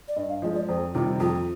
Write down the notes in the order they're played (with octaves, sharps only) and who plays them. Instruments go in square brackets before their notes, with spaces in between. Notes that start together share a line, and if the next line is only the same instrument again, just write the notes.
[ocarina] D5
[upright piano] G2 [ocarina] D#5
[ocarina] F5
[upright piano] F3 G#3 [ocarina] D#5
[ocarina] D5
[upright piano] F2 [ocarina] C5
[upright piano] C3 D#3 G3 [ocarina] F4
[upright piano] F2 [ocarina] F4